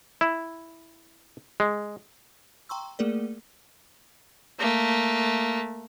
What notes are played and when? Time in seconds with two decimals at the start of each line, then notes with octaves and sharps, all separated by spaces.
0.21 E4
1.60 G#3
2.69 G5 A#5 C6 C#6 E6
2.99 A3 A#3 G#4 A#4 D5
4.60 A3 A#3